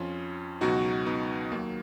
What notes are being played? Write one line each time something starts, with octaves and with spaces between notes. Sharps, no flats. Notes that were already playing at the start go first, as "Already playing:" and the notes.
Already playing: F2 F3 C#4 F4
C#2 B2 F#3 D#4 F#4
B3 D#4
D#2 D#3 F#3 A#3